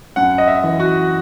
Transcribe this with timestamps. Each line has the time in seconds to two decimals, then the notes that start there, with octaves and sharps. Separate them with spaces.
0.16 F#2 F#5
0.38 D#5
0.48 E5
0.64 E3
0.80 F#4